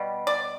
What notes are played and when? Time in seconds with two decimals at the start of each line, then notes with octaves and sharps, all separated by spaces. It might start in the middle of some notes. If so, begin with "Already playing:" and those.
Already playing: B2 G3
0.27 D5